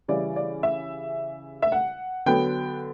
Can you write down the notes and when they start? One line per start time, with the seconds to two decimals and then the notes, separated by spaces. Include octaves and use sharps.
0.08 C#3 E3 G3 D5
0.36 D5
0.63 E5
1.62 E5
1.72 F#5
2.26 D3 F#3 B3 G5